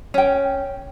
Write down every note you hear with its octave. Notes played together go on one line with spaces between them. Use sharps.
C#4 G5